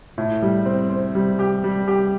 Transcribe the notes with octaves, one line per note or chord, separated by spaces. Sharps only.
A2
G3
C4
C4
G3
G4
G3
G4